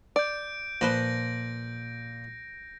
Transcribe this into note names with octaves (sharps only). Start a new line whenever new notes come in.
D5 G6 D7
A#2 F3 B4 C5 A#6